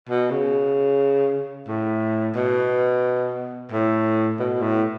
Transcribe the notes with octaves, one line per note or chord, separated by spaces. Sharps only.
B2
C#3
A2
B2
A2
B2
A2